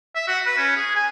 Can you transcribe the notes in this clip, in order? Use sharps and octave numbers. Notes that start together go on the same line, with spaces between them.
E5
F#4
B4
C#4
G#4
G#5